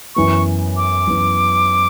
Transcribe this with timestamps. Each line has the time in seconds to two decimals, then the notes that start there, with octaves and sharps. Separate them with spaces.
0.15 F#2 E3 B3 C#6
0.77 D6
1.07 F#2 E3 B3